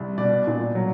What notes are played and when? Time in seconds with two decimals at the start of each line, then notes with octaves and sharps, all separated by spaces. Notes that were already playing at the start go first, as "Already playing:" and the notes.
Already playing: C2
0.18 B2 D5
0.47 A#2
0.75 F#3